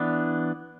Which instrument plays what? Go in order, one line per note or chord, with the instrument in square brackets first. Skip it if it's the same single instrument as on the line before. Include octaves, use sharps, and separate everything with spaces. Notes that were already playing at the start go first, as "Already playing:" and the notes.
Already playing: [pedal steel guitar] E3 B3 D4